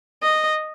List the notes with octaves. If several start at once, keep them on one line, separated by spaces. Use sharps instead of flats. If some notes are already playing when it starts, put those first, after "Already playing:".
D#5